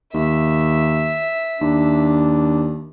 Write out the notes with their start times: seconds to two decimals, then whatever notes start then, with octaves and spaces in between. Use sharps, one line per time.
0.13 D#2 E5
1.61 D#2 D4